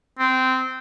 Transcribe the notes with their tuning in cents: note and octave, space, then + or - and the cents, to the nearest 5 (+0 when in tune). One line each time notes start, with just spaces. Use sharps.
C4 -15